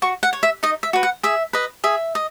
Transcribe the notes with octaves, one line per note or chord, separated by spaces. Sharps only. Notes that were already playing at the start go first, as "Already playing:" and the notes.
F#4 C#6
F#5
C#5
E5
D#4 D#5
E5
F#4 B4
F#5
G#4 E5
B4 D#5
G#4 E5
D#5